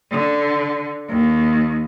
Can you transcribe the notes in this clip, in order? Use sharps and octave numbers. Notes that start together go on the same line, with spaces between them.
D3
D#2